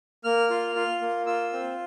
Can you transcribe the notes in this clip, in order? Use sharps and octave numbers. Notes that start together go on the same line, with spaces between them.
A#3 F6
F4
F4
A#3
F4 E6
C4